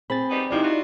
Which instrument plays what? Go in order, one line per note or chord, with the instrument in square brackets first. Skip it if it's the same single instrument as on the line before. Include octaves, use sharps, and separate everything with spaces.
[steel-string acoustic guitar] C4 G#4 [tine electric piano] B5 A6
[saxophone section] D#3 G3 B3
[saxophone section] C3 F3 A#3 [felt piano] D#4 E4 G4 [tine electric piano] D5
[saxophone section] F4 F#4